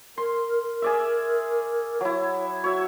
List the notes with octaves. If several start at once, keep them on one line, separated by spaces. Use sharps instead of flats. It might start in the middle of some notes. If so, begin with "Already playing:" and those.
A#4 C6
A#4
G#4 D5 E5
F#3 E4 C#5
F#4 C#5 E5